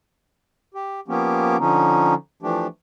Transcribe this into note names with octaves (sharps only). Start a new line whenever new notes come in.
G4
F3 A#3 B3 C#4 G4
D3 F3 C#4 D#4
E3 F3 A3 D4 G4